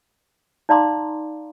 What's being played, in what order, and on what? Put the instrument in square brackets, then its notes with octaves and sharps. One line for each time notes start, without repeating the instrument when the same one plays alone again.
[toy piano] D#4 D5 F5 A#5 C6 D6